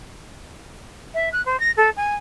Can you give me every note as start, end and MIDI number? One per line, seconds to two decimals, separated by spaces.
1.14 1.29 76
1.33 1.44 90
1.46 1.59 72
1.60 1.71 94
1.77 1.90 69
1.97 2.15 80